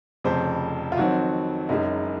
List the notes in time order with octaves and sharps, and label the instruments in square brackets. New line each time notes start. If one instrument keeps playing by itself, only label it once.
[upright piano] F1 F2 C#3 C5
F4
F2 D#3 F#3 C4 F#4
F#1 F#2 C#3 G#3 D#4